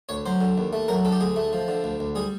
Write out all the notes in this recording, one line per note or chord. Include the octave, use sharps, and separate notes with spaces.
D2 C#5
F#3 C5
D3
D#2
A3
F#3 A#4
D3 A4
G4
D2 G#4
A3
F3
D3
D2
D2
G3 G#4